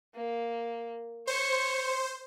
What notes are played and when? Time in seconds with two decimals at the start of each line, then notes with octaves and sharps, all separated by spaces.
0.15 A#3
1.27 C5 C#5